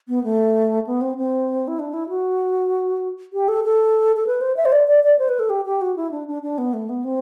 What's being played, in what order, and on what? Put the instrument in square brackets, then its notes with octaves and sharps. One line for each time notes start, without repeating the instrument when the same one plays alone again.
[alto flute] B3
A3
B3
C4
C4
E4
D4
E4
F#4
G4
A4
A4
A4
B4
C5
E5
C5
D5
D5
D5
C5
B4
A4
G4
G4
F#4
E4
D4
D4
D4
B3
A3
B3
C4